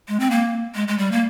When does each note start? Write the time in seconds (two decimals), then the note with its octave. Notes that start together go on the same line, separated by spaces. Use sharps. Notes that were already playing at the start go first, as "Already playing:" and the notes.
0.08 G#3
0.20 C4
0.31 A#3
0.75 G#3
0.88 G#3
0.98 G3
1.12 A#3